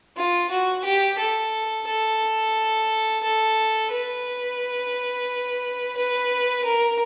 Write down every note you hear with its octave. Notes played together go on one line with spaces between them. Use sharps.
F4
F#4
G4
A4
A4
A4
B4
B4
A#4